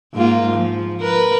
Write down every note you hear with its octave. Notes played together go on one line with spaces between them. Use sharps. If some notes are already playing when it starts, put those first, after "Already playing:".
G#2 A#3 F4
F3
A#4 B4